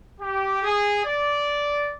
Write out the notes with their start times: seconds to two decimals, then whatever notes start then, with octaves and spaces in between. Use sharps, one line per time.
0.19 G4
0.63 G#4
1.04 D5